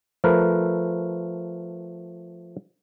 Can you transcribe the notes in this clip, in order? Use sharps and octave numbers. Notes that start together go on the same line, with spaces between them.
F3 A3 A#4 B4